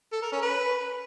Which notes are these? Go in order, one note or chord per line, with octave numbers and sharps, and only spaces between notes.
A4
A#4
C#4
B4